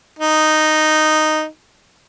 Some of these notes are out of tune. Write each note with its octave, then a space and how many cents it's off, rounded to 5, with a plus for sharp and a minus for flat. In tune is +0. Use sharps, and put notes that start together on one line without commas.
D#4 -5